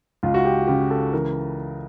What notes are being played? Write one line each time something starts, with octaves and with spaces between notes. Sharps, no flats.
C#2 F4
F#4
G4
C#3 G4
A4
E3 A#4